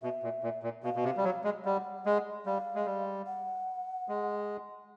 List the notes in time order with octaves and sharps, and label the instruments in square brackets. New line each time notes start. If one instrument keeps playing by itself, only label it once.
[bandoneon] B2 [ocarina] E5
[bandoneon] A#2
A#2
A#2
[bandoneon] B2 [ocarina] F5
[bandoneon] B2
C3
G3
F#3
G#3
[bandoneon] G3 [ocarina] F#5
[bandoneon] G#3
[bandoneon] G3 [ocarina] F5
[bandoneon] G#3
G3
[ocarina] F#5
[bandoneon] G#3